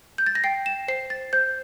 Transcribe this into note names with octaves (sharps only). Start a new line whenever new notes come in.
G6
A6
A#6
G5 C7
E7
C5 C7
A6
C5 G6